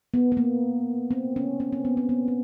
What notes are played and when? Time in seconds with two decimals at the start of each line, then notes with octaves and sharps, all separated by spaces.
0.14 B3
0.32 B3
0.37 A#3
1.11 C4
1.36 C#4
1.60 C#4
1.72 C4
1.85 B3
1.97 C4
2.09 B3
2.28 C4